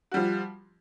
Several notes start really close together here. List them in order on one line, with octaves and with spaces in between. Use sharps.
F#4 G3 F3